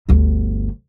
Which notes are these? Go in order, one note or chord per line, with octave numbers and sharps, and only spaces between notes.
G1 D2